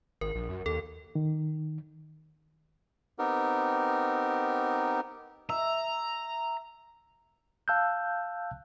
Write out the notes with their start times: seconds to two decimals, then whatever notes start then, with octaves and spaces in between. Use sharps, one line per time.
0.21 G#1 A#4
0.35 A#1
0.49 F#2
0.66 D#2 A4
1.15 D#3
3.19 B3 C4 D#4 G4 A#4
5.50 E5 A#5
7.68 F5 A5 E6 F#6 G6